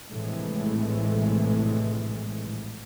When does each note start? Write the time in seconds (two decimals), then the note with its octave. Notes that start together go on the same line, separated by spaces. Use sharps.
0.10 A#1 A2 C3 E3 G#3 A3